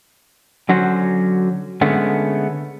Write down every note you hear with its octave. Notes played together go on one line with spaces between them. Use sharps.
D3 F#3 C#4 F#4 C5
D3 G#3 A3 B3 C#4